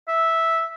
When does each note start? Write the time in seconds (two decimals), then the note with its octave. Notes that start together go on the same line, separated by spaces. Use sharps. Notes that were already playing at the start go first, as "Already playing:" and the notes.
0.08 E5